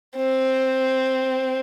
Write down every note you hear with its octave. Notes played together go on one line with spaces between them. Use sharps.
C4